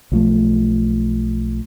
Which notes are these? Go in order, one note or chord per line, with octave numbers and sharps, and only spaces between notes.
B1 F3 A3